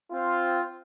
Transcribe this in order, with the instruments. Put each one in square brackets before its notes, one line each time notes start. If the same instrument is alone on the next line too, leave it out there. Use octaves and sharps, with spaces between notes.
[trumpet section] C4 F4